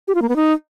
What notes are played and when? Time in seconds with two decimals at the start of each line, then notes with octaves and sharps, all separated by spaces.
0.08 G4
0.15 F4
0.22 A#3
0.29 B3
0.36 D#4